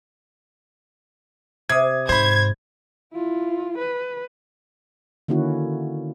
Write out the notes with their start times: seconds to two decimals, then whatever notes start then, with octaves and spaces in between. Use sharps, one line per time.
1.69 C3 D#6 G#6
2.09 G#2 C5 B5 G#6
3.14 E4 F4
3.78 B4
5.28 D3 D#3 A#3 C#4 E4 F#4